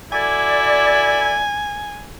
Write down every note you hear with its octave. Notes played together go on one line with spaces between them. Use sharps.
E4 F#4 A4 D5 G#5